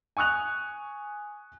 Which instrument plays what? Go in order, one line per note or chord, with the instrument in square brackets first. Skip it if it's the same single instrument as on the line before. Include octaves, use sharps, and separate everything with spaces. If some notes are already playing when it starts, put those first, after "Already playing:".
[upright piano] G#5 C#6 D#6 F#6 F7